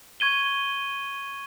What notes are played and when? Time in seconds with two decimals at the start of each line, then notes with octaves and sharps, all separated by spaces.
0.20 C#6 G#6 D#7 G7